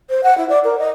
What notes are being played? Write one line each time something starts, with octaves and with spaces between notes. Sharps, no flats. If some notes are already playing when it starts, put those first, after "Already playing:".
C5
F#5
E4
D5
A#4
D#5